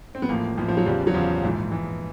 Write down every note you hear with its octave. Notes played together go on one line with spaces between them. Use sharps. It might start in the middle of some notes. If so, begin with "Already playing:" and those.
C4
B3
A1 A2 F3 A#3
A1 A2 F3
F3
F#3
E2 C#3 F3 G3
F#3
E2 C#3 F3
A#1 G#2 E3
A#1 G#2 E3